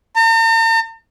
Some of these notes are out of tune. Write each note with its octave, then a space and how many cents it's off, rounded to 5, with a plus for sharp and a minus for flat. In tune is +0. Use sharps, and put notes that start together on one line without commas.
A#5 -45